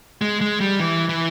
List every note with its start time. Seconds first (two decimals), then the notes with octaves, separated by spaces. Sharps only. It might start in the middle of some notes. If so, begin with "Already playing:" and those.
0.21 G#3
0.41 G#3
0.60 G3
0.80 E3
1.09 E3